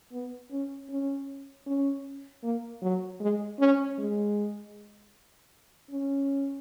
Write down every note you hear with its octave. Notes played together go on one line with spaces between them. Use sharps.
B3
C#4
C#4
C#4
A#3
F#3
G#3
C#4
G#3
C#4